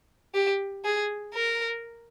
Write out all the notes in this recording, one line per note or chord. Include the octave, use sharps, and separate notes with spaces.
G4
G#4
A#4